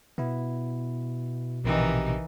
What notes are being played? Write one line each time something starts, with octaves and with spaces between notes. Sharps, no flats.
B2 B3 E4
A#1 C3 D#3 E3 D#4 G4